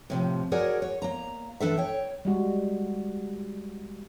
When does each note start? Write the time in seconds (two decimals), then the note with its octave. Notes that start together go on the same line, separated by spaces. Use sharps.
0.10 A2 C3 F3
0.52 F#4 G#4 A#4 C#5 D5
0.82 C#5
1.02 A#3 A#5
1.60 E3 D4 A4 E5
1.78 C#5 G5
2.25 G3 G#3 F#4